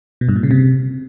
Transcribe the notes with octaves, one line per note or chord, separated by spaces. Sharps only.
B2
G2
A#2
C#3
C3